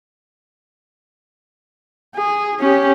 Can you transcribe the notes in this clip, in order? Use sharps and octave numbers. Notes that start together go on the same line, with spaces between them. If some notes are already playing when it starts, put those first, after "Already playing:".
G#4
C#4 G4